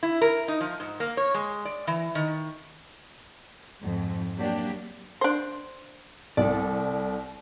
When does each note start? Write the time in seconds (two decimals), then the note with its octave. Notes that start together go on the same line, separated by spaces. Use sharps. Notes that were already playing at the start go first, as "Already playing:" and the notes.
0.03 E4
0.21 A#4
0.48 D#4
0.61 F3
0.80 G#2
1.00 A#3
1.17 C#5
1.34 G#3
1.65 D5
1.87 E3
2.15 D#3
3.81 F2 G#2
4.36 F#3 A#3 D4 G4
5.21 D4 C5
6.37 C2 A4 D5